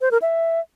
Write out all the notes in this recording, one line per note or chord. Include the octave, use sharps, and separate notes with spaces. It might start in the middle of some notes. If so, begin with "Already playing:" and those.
C5
A#4
E5